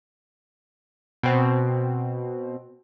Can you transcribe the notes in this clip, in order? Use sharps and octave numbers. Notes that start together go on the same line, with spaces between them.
B2 C4